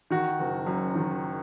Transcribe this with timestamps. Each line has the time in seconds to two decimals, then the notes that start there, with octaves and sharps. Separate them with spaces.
0.10 D#3 F#4
0.39 F#1
0.67 F#2
0.95 D#3